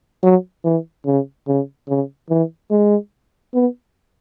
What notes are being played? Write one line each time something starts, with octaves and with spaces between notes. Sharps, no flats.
F#3
E3
C#3
C#3
C#3
E3
G#3
B3